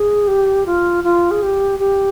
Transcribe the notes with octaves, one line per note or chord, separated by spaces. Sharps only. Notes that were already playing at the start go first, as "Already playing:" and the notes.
Already playing: G#4
G4
F4
F4
G#4
G4
G4